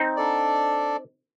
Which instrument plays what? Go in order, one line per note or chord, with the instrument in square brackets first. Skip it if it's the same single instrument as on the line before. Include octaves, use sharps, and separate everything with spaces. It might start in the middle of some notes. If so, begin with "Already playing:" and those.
Already playing: [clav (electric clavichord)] C4 D#4
[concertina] D4 A4 D5